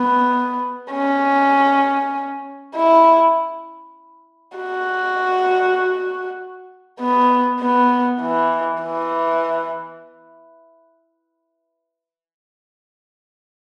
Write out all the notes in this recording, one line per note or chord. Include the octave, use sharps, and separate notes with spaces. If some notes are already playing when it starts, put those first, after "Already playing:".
Already playing: B3
C#4
E4
F#4
B3
B3
E3
E3